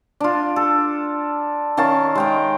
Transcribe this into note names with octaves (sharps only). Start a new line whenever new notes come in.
D4 F4
A4
D#3 C#4 F5 A5
G#3 G5 A#5